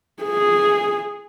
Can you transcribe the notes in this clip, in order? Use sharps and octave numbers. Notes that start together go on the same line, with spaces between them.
G#4